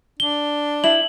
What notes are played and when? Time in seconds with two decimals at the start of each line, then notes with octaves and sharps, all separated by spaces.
0.20 D4 G7
0.84 E4 F#7